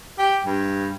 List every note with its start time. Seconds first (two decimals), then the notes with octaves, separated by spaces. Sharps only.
0.18 G4
0.46 G2